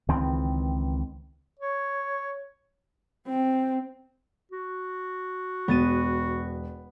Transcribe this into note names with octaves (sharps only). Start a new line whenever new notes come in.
C#2 D#3 E3 C4
C#5
C4
F#4
E1 B3 A6 D#7